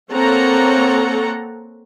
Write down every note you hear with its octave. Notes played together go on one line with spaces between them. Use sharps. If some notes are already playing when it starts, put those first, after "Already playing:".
A#3 C4 A4 C#5 F#5 A#5